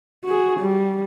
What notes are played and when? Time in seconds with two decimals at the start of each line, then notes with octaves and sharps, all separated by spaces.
0.25 F#4 G#4
0.60 G3